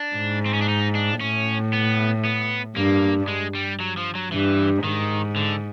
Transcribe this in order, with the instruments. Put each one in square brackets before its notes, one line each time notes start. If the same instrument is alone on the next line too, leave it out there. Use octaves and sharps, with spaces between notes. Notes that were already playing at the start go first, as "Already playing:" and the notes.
Already playing: [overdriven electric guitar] D4
[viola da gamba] G#2
[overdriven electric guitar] C4
C#4
D4
D#4
D4
[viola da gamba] A2 [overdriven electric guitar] C#4
[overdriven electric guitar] B3
B3
[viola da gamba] G2 [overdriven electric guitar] A#3
[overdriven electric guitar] G#3
G3
F#3
F3
F#3
[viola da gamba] G2 [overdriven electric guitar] E3
[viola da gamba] G#2 [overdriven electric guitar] D#3
[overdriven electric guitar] D3